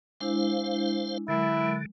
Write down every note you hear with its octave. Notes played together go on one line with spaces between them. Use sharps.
G#3 D4 E4 C5 F5
D3 F#3 G#3 E4 A#4